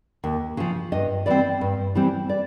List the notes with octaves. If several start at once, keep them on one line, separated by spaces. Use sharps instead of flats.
D#2
C#3 F3
G2 D#5
E3 G3 C4 D5
G2
E3 G3 C4
D5